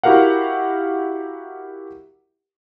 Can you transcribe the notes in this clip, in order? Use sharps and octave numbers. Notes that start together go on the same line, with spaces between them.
E4 F#4 G4 A#4 F5 F#5